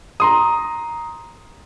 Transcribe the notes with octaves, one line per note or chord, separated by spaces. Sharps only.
A#5 C6 D#6